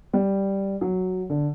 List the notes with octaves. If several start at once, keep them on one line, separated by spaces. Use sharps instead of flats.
G3
F#3
D3